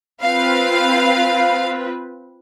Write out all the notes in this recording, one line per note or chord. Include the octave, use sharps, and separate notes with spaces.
C4 F4 B4 F5